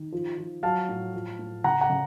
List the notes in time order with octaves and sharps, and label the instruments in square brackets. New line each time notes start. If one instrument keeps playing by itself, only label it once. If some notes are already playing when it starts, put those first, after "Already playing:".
Already playing: [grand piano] D#3
F3
F3
F#3 F5 A5
A2
F3
A2
C#3 F#5 A#5
F#5 A#5
C#3